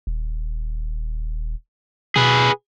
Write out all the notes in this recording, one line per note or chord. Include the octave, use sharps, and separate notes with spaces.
D#1
B2 G#4 B4